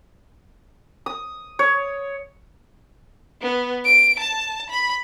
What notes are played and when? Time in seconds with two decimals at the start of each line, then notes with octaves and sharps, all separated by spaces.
1.06 D#6
1.59 C#5
3.42 B3
3.84 D7
4.20 A5
4.70 B5